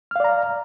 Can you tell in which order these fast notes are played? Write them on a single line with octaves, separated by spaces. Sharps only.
F6 F5 D5 A#5